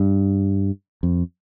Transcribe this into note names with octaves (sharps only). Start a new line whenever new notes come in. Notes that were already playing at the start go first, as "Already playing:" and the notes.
Already playing: G2
F2